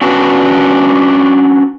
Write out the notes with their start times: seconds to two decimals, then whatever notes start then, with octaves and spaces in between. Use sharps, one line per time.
0.02 C#4 D4 F#4 B4